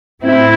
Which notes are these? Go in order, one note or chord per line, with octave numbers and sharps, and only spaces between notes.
A2 C4 E4